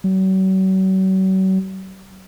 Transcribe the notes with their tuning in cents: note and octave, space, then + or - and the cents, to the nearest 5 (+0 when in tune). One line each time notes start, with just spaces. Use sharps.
F#3 +40